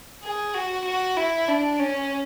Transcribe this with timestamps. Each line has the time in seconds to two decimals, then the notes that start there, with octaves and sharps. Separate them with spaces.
0.23 G#4
0.54 F#4
0.85 F#4
1.17 E4
1.48 D4
1.79 C#4